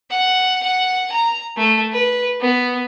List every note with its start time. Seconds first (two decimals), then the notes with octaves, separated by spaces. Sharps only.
0.10 F#5
0.63 F#5
1.12 A#5
1.57 A3
1.92 B4
2.41 B3